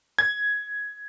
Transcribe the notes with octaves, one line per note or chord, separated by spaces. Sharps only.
G#6